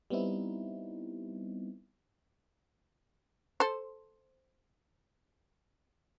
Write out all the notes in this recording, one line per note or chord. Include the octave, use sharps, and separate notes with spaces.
G3 B3 C4 D#4 E4
A4 C5